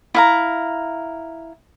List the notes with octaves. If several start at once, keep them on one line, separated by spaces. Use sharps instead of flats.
E4 F5 A#5